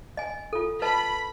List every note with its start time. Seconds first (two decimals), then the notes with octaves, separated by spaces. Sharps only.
0.17 D#5 G#5
0.53 F4 A4
0.82 B4 D#5 A5 B5